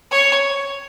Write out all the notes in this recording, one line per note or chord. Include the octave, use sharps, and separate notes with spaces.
C#5